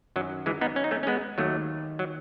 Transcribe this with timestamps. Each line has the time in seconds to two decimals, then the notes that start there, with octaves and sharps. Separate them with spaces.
0.16 F#2 D#3 F#3
0.46 E3 G#3
0.61 B3 D#4
0.76 C#4
0.84 D#4
0.91 A3 C#4
1.03 C#4
1.07 G#3 B3
1.38 D#2 D#3 F#3 A3
1.99 F#3